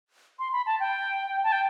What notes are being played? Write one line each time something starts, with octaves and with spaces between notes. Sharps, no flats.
C6
B5
A5
G5
A5
G5